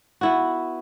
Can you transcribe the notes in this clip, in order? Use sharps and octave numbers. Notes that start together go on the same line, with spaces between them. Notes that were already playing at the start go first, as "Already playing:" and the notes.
B3 E4 F#4